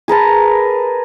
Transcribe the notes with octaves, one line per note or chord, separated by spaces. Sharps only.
G#4 A#4 B4 A5